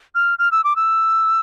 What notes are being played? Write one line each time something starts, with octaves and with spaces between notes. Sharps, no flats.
F6
F6
E6
D6
E6